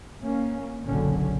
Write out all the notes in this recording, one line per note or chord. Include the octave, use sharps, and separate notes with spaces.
A#3 C#4
F#1 B1 F#2 A#2 D3 C#4